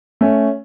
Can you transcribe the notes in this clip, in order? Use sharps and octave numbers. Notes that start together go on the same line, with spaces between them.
A3 C#4